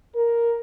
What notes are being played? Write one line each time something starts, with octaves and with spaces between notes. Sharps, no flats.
A#4